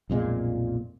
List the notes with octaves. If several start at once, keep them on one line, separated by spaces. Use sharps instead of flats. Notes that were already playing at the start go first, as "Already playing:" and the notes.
B1 F2 A#2 G#3